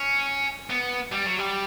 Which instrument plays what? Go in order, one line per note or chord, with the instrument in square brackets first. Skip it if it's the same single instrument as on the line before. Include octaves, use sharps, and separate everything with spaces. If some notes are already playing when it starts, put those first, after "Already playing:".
Already playing: [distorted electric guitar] C#4
B3
G3
F#3
G3